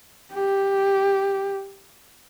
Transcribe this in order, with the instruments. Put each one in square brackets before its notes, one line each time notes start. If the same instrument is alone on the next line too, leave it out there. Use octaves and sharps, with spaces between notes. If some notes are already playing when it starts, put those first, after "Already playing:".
[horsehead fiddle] G4